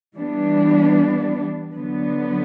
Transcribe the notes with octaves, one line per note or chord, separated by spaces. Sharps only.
E3 G3 B3 D4
D3 F#3 B3